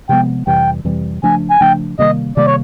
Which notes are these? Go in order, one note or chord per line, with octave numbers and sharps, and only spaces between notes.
C3 F3 G#3 B3 G5
F2 C3 E3 G3 G5
F2 C3 E3 G3
C#3 F3 A3 D4 G#5
G#5
C#3 F3 A3 D4 G5
C3 D#3 G3 A#3 D#5
C3 D#3 G3 A#3 D5
C#5